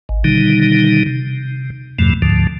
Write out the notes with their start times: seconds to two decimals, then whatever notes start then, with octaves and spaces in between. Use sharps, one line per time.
0.09 G#1
0.24 B2 D3 D#3 G3 D#4
1.06 C3
1.99 E2 G2 B2 F3 A3
2.22 D2 G#2 D3 F3